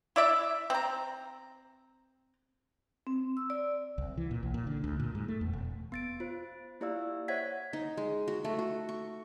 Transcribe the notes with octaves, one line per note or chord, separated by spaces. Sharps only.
E4 D5 E5
C4 A#5
C4
E6
D5
C2
E3
A#2
B1
A#2
D3
D2
A#2
G#2
A3
E2
E1
B3 A6 D7
F4 C5
A#3 E4 G4 D5 F5 E6
C5 C#5 E5 F#5 G#6 B6
D#4
G#3
F#4
A3
F#4
C#6